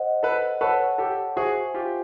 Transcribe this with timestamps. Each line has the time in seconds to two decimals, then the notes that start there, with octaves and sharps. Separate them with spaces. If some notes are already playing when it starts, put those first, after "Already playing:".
Already playing: C5 D#5 F#5
0.23 A4 B4
0.61 A4 B4 C#5 F#5 A5 C#6
0.98 G4 A4
1.36 F#4 G#4 C5 E5 G#5 C#6
1.74 F4 G4